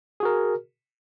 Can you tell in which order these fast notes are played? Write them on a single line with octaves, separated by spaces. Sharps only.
G#4 F#4 A#4